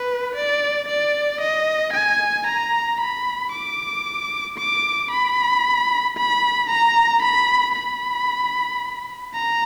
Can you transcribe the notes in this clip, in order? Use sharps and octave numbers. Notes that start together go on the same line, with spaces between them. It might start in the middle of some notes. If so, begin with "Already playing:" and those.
Already playing: B4
D5
D5
D#5
G#5
A#5
B5
D6
D6
B5
B5
A#5
B5
B5
A#5